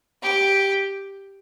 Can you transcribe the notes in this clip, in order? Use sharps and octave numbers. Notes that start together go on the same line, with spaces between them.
G4